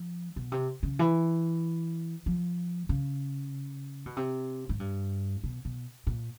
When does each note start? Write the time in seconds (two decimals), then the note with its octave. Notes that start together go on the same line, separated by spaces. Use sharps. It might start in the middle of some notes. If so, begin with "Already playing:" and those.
Already playing: F3
0.36 B2
0.52 C3
0.83 C#3
0.99 E3
2.26 F3
2.89 C#3
4.06 B2
4.17 C3
4.69 G#2
4.80 G2
5.44 B2
5.65 B2
6.07 A#2